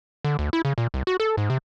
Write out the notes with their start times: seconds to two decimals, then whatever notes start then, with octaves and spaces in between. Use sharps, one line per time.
0.24 D3
0.39 D2
0.53 E4
0.65 C#3
0.78 A#2
0.94 C2
1.07 F#4
1.20 A4
1.37 G#2
1.50 C3